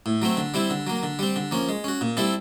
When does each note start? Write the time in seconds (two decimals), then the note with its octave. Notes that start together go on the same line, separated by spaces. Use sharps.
0.06 A2
0.22 F#3 A3 C4
0.37 D3
0.54 G3 C4 E4
0.70 D3
0.87 F#3 A#3
1.03 D3
1.19 G3 C4
1.36 D3
1.51 F3 A#3 C#4
1.69 G#3
1.84 C#4 F#4
2.01 A#2
2.17 G3 C4 E4 A4